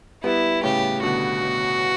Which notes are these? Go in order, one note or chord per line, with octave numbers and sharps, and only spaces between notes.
G3 B3 E4
A2 C#3 G4
B2 D3 F#4
B2